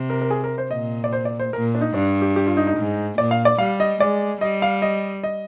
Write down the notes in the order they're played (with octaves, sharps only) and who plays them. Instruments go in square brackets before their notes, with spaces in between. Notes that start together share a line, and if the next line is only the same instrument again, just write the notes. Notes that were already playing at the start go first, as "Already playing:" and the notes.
Already playing: [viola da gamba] C3
[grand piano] A#4
A#4
G#4
A#4
C5
[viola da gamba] A#2 [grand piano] D#5
[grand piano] D5
C5
D5
C5
[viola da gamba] A#2 [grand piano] A#4
[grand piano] D4
D#4
[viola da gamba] G2 [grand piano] D4
[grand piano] G4
G4
F4
D#4
D#4
[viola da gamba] G#2
[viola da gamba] A#2 [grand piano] D5
[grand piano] F5
D5
[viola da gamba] G3 [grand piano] F5
[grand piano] D#5
[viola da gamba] G#3 [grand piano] D5
[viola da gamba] G3 [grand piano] D#5
[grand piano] F5
D#5
D#5